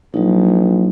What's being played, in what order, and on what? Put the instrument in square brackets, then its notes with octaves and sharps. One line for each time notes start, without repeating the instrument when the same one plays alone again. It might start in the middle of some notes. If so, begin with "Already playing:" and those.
[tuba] A#1 [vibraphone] F#3 D#4